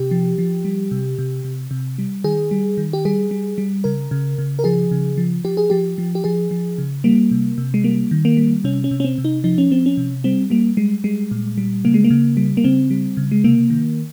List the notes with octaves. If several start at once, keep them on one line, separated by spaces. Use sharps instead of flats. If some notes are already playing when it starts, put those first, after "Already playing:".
Already playing: C3 G4
F3
F3
G3
C3
C3
C3
C3
G3
D#3 G#4
G3
D#3
G4
G3 G#4
G3
G3
C#3 A#4
C#3
C#3
A#4
F3 G#4
C#3
F3
F3 G4
G#4
F3 G4
F3
G4
F3 G#4
F3
C#3
G3 A#3
C3
C3
G#3
G3 A#3
D#3
A#3
G3
C3 C#4
C#4
C3
C#4
C4
C3
D#4
F3 D#4
C#4
F3 C4
C#4
C3
G3 C4
G3 A#3
G3 G#3
G3 G#3
A#2
G3
C#3 A#3
G#3
A#3
C#3
G3
A#3
C#3 C4
G3
C#3
G#3
C3 A#3
D#3